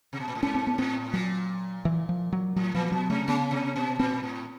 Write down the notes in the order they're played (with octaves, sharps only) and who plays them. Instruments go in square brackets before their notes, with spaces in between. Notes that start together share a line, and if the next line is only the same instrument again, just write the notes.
[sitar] C3
B2
A#2
A2
[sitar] G#2 [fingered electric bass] C#4
[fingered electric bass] C4
B3
[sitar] A2 [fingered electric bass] C4
[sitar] A#2 [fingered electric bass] F#3
[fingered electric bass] E3
F3
F#3
[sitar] A2 [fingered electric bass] F#3
[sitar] A#2 [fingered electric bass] F3
[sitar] B2 [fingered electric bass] F#3
[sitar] C3 [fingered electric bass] A3
[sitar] C#3 [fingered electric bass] B3
[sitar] C3
B2
[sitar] A#2 [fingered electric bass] C4
[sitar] A2